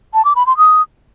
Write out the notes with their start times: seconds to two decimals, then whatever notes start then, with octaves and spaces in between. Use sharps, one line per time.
0.14 A5
0.25 D6
0.36 B5
0.47 C6
0.57 D#6